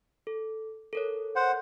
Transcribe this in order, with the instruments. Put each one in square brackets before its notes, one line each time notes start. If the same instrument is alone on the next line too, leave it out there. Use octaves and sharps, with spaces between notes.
[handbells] A4
A4 A#4 C#5
[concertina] C5 F#5